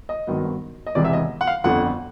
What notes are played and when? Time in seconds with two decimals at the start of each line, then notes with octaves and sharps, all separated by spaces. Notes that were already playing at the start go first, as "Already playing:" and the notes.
0.09 D#5
0.27 G#1 G2 D#3 F#3 B3
0.86 D#5
0.95 E1 E2 C3 E3 D5
1.04 E5
1.13 D#5
1.41 F#5
1.47 F5
1.64 G1 F2 D3 F#5